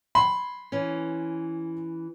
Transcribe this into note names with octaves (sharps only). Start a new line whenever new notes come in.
B5 C6
E3 C#4